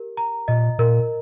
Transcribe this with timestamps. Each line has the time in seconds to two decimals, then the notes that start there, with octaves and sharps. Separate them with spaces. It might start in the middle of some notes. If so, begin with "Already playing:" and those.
Already playing: G4 A#4
0.17 A#5
0.48 A#2 D#5
0.79 A#2 A#4